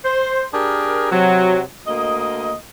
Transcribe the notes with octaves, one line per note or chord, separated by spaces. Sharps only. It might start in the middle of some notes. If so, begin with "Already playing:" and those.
C5
D4 G4 G#4 A#4
C3 F#3
D2 A#3 D#5